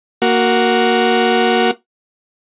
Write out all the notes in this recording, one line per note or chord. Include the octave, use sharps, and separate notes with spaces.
A#3 F#4